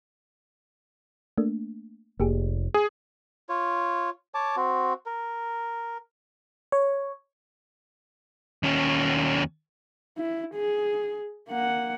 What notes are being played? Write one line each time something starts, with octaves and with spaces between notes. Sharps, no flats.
A3 A#3 D4
F1 A#3 G4 G#4
G#4
F4 C#5
C#5 A5 D6
C4 F#4
A#4
C#5
D#2 C#4
E4
G#4
A#3 F#5